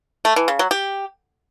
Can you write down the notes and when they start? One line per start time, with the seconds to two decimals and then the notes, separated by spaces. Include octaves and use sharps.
0.25 A3
0.36 E3
0.48 C#3
0.59 F#3
0.71 G4